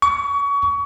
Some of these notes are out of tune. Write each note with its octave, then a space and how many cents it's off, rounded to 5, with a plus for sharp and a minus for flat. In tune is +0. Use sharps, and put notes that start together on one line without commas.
C#6 +30